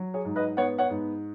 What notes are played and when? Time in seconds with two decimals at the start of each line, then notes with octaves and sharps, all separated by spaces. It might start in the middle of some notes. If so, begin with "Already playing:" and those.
Already playing: F#3
0.14 G#4 C#5
0.25 G#2
0.36 B4 D#5
0.57 B3 C#5 F#5
0.78 C#5 F#5
0.90 G#2